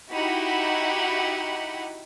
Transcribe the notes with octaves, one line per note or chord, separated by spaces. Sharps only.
D#4 E4 F#4 G4 F#5 B5